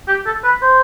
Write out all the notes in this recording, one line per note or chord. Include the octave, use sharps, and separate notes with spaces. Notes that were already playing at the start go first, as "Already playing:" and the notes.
G4
A4
B4
C5